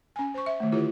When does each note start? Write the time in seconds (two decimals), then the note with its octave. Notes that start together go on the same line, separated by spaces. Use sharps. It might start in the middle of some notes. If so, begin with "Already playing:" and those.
0.16 C#4 G#5
0.34 C5 C#6
0.46 E5
0.60 D#3 A3
0.72 D3 E4 F4 G4 C#5